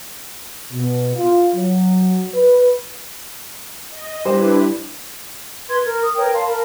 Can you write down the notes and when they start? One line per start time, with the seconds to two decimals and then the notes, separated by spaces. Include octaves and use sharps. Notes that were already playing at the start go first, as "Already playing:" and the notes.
0.72 B2
1.15 F4
1.55 F#3
2.34 B4
3.90 D#5
4.25 G3 D4 E4 B4 C5
5.69 B4 C6 G#6
5.85 A#4
6.03 D#6
6.16 A#4 B4 C#5 G5
6.34 F5 A5 C6
6.47 A#4 A5 B5